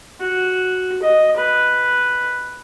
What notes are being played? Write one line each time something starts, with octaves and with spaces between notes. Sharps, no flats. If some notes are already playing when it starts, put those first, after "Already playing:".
F#4
D#5
B4